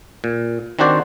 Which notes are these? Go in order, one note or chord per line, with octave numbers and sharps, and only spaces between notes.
A#2
D#3 C4 D4 F#4 C5 D5